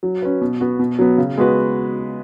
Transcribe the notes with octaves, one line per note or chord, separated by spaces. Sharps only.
F#3
C#4 B4
B2
B3 F#4
B2
F#3 B3
C#3
G#3 B3 F#4 B4